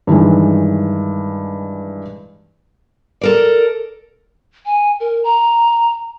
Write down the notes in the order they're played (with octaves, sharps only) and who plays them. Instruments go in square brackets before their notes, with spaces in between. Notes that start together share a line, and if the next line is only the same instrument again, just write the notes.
[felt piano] G2 D#3 E3 G#3
[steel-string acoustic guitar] A4 A#4 D5
[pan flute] G#5
A#4
A#5